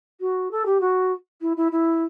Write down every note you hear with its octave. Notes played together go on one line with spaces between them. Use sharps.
F#4
A4
G4
F#4
E4
E4
E4